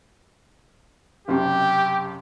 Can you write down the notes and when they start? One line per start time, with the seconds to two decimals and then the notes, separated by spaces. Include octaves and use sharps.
1.28 F#1 F#2 C3 G4